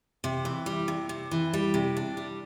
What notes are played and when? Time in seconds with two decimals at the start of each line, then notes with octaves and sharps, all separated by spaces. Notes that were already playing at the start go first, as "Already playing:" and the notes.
0.24 C3
0.45 E3
0.66 G3
0.88 C3
1.09 C3
1.31 E3
1.53 G3
1.74 C3
1.97 D4
2.17 G3